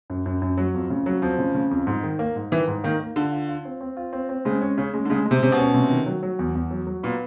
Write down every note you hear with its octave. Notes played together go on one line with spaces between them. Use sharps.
F#2
F#2
F#2
F#3
F2
C#3
F#3
F2 F3
C#3
C#3
F2
G#2
D#3
A#3
G#2
D#3 E3
G#2
D#3 A#3
A#3
D3 F4
F4
F4
C4
C4
F4
C4
C4
C#3 G#3
C#4
C#3 C#4
G#3
D3
C#3 G#3
G#3
C3
C3 C#4
B2
C#4
C3
D#3
F#3
F#3
E2
E2
F#3
F#3
A#2 B3